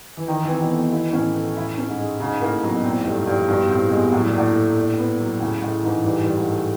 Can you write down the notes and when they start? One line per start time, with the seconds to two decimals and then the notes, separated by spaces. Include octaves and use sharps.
0.17 E3
0.28 D#3 D#4
0.44 E3
0.49 C4
0.60 B2
0.70 A3
0.76 B2
0.92 B2 E4
1.13 A2 C#4
1.35 A3
1.56 A2 E4
1.78 C#4
1.88 G#2
1.98 G#3
2.20 G#2 C#3
2.41 A2 A#3
2.62 B2 F#3
2.72 B2
2.82 A#2 C4
2.89 A2
2.97 G#2
3.05 G2 A3
3.26 G2 F3
3.48 G2 B2
3.69 A2 C4
3.91 B2 G#3
4.12 A2 F#3
4.25 A#2
4.34 A2 D4
4.56 A3
4.76 D4
4.98 B3
5.20 F#3
5.40 A2 C#3
5.62 A2 G#3
5.83 G#2 E3
6.04 G2 E3
6.23 G2
6.26 D4
6.37 G#2
6.48 A3